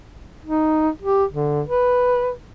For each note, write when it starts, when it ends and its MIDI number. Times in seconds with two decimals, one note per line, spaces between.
0.45 0.89 63
1.02 1.25 67
1.32 1.62 50
1.67 2.31 71